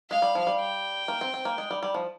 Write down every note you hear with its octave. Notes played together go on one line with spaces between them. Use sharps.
G#3 F5
G3
F3
G3
G5
A#3
C4
C4
A#3
G#3
G3
G3
F3